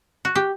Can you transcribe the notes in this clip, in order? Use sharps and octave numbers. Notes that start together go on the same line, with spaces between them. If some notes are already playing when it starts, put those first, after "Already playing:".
F#4
G4